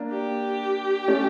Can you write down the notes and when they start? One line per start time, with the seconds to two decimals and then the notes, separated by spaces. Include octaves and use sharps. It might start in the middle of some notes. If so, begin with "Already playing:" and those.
Already playing: A#3 D4
0.11 G4
1.08 A3 C#4